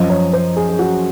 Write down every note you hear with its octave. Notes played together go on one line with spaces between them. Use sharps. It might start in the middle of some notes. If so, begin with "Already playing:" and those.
Already playing: F#2 F3 D#5
C#5
C5
G#4
G#4
F#4